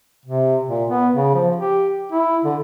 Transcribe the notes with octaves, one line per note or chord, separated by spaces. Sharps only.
C3
A#2
B3
C#3
F3
G4
E4
D3